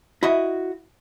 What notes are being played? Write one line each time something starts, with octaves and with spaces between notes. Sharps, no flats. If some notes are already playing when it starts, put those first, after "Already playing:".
E4 F#4 D#5